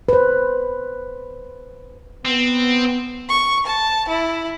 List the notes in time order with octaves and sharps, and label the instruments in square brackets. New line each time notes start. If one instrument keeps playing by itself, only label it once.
[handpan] B4 C5
[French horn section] B3 [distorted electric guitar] C4
[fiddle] C#6
A5
E4